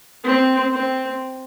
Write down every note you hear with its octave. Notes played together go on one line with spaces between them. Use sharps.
C4
C4